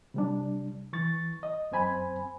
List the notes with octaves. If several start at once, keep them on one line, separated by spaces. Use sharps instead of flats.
C3 G3 D4
E3 C#6 A6
D#5
F#2 C4 C5 G#5 B5